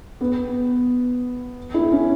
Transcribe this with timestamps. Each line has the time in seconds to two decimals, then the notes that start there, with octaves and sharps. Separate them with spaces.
0.21 B3
1.74 E4
1.92 C#4